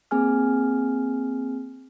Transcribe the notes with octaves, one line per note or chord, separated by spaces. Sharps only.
A#3 C4 G#4 G#5 F6